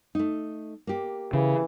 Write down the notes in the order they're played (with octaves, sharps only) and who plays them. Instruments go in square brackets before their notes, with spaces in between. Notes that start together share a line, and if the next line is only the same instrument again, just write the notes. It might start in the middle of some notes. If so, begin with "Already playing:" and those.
[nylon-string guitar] A3 D#4
A#3 G4
[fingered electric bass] C#3 [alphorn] E3